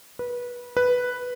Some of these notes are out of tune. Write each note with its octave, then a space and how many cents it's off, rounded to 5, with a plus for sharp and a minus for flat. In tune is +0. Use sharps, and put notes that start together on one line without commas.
B4 -20
B4 +0